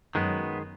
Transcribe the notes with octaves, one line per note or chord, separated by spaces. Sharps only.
F#2 D#3 F#3 G#3 B3